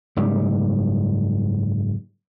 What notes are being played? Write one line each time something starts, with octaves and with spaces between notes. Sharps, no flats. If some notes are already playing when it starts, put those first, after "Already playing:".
F#1 G#2 G3